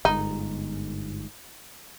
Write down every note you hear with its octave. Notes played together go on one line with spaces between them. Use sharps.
G1 G#2 D#4